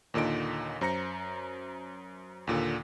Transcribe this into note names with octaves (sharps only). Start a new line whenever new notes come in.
D#2 A#2 D3 D#4 D7
F#2 C5 A#5 A#6 C#7
D#2 A#2 D3